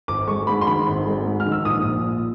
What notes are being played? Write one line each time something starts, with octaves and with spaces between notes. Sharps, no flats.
G#1 D6
G#3 C#6
G#2 B5
C6
D#3 B5
G#1
G#3
G#2
F6
D#3
E6
A#1 D#6
A#1
A#2